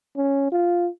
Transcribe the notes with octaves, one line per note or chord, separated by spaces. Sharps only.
C#4
F4